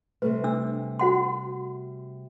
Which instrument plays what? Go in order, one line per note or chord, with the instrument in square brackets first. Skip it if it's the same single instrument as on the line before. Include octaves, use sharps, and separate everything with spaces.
[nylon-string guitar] C3 G3 A3 [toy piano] B4
[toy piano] D4 E6
F#4 F#5 C6